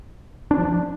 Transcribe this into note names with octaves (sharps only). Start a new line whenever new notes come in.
D4
F3
D4